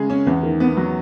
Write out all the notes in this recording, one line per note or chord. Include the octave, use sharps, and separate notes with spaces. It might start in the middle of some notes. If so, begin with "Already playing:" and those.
Already playing: C#3 G#3 G#4
C#4
E2
D#3
B3
F#3